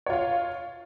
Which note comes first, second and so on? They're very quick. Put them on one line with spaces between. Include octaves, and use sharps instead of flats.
C#5 F4 F5